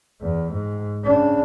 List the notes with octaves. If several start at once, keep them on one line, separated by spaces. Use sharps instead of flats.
E2
G#2
C#3 D4